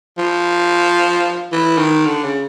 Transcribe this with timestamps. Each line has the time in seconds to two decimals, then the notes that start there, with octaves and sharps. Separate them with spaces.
0.18 F3
1.52 E3
1.78 D#3
2.06 D3
2.24 C#3